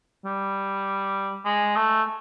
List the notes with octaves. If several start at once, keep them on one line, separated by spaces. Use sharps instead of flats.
G3
G#3
A3